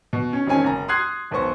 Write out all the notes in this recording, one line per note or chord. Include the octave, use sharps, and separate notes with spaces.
B2
C#4
E1 D#3 C4 C#4 G#5
F#1 A#5
C6 D#6 F6 F#6 G#6 C7
E1 B1 B3 C5 C#6